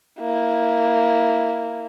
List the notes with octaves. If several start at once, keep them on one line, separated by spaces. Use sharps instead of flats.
A#3 E4